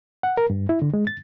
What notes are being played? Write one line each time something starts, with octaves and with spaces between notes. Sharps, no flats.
F#5
A#4
G2
E4
D3
G#3
A6